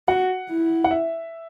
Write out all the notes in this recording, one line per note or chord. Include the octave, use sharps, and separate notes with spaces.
F#4 F#5
E4
F#5
E5